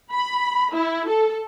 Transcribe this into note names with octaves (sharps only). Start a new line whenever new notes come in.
B5
E4
A4